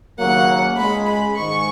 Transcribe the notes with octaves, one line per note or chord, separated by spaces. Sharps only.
D#2 C#3 F#3 A#3 F#5
C#2 C#3 G#3 B5
B5
G#2 D#3 G#3 C#6